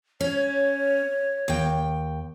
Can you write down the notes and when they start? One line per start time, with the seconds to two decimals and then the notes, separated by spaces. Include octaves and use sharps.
0.21 C#4 C#5
1.48 D#2 G5